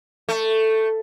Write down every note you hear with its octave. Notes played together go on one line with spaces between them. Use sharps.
A3